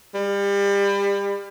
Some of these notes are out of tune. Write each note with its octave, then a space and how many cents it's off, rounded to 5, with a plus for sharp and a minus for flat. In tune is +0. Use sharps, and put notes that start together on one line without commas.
G3 +30